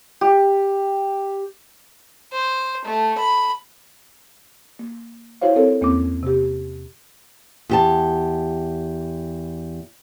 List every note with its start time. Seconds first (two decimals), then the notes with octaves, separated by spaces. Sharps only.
0.21 G4
2.33 C5
2.85 A3
3.18 B5
4.79 A#3
5.41 E4 F#4 C5 C#5 F5
5.56 C4 A4 A#4 C#5
5.81 E2 A#3 C4 C#4 D6
6.23 C3 G4
7.69 E2 G4 A5